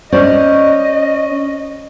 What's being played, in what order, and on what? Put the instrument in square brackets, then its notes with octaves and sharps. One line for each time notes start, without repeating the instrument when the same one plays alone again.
[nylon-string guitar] C#4 C5 D5 [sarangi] D#5